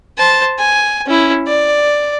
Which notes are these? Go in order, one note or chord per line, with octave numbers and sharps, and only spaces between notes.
C5 A5
G#5
C#4 E4
D5